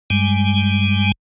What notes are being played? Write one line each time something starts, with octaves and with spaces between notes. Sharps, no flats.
G2 G3 G#3 G#5